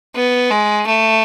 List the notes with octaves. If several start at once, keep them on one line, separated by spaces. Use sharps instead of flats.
B3
G#3
A3